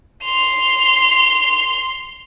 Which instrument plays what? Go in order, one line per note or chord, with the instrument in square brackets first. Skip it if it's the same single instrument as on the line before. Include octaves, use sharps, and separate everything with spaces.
[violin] C6 F7